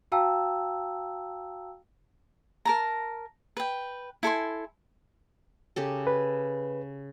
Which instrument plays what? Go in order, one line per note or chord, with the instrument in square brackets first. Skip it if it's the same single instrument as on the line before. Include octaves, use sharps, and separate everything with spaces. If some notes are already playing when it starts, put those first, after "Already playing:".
[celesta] F#4 F5 G5 A5 A#5 E6
[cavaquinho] A#4 A5 A#5
B4 G5
E4 A4 G#5 C6
[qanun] C#3 G4 A4
[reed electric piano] B4